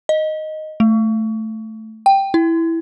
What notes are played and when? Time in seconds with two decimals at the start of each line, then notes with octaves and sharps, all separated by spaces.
0.09 D#5
0.80 A3
2.06 G5
2.34 E4